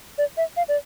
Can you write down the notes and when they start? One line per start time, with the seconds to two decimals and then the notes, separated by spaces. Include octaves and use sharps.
0.18 D5
0.37 E5
0.57 F5
0.69 D5